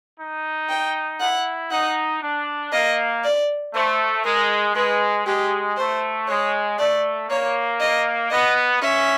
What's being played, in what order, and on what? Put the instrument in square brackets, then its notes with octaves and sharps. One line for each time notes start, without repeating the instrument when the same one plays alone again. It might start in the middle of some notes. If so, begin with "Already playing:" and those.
[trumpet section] D#4
[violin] G5
[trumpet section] E4 [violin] F#5
[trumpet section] D#4 [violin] F#5
[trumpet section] D4
[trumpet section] A#3 [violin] D#5
[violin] D5
[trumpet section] A3 [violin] C5
[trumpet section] G#3 [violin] A#4
[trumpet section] G#3 [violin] B4
[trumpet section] G#3 [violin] G4
[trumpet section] A3 [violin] C5
[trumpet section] G#3 [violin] C#5
[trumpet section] A3 [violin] D5
[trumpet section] A#3 [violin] C#5
[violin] D#5
[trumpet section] B3 [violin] D#5
[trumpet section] C#4 [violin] E5